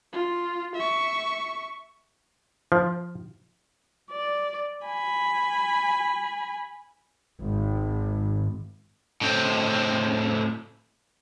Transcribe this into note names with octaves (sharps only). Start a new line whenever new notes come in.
F4
E5 C#6
F3
D5
G#5 B5
G#1
A2 C4